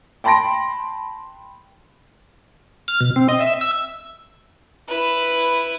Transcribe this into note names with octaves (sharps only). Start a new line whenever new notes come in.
G5 A5 B5 C6 A#6 D7
F6
B2
C4
D#5
E5
E6
E4 B4